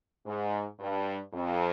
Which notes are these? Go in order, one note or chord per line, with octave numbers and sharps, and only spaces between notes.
G#2
G2
F2